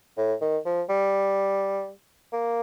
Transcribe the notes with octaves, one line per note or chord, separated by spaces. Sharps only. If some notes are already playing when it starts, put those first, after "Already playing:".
A2
D#3
F3
G3
A#3